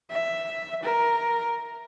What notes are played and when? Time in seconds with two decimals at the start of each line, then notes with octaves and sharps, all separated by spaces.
0.10 E5
0.83 A#4